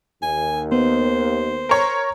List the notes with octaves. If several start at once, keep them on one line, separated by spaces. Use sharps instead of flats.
D#2 G#5
B3 C5
A#4 C#5